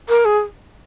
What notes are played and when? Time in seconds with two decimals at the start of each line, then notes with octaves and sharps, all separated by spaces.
0.09 A#4
0.25 G#4